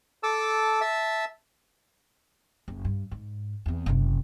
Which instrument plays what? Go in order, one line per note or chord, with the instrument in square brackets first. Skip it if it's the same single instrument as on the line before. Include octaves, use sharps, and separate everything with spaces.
[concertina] A4 A5 D6 E6
E5 A5 E6
[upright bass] F#1
G2
G#2
E2 C4
F#1 C3